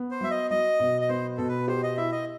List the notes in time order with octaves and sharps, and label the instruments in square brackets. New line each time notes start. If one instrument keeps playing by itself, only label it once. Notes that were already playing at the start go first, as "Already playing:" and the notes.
Already playing: [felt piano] B3
[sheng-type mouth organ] C5
[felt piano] F#3 [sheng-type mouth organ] E5
[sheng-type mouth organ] D#5
[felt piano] F#3 [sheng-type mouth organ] D#5
[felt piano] B2
[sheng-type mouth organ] D#5
[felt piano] B3 [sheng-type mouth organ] C5
[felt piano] B2 [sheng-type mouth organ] A4
[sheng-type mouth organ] B4
[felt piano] G4 [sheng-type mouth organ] C5
[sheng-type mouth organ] D#5
[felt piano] E4 [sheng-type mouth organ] E5
[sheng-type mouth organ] D#5